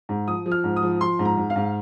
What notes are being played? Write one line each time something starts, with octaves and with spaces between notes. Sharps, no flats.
G#2
F3 D#6
F3
F6
G#2
D#6
F3
F3 C6
G#2
A#5
G#2
F5
G#2